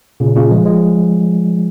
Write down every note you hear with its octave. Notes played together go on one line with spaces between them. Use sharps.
A#2 C#3
A#2 C#3
F3 G#3
F3 G#3